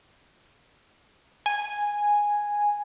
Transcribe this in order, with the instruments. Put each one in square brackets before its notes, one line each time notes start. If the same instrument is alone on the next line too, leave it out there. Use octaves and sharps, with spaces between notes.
[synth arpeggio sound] G#5